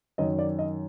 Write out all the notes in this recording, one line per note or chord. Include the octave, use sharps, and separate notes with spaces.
F#2 D#3 F#3 D#5
D5
D#5